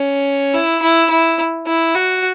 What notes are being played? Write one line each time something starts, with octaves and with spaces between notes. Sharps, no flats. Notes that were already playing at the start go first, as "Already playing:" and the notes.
Already playing: C#4
E4
E4
E4
E4
F#4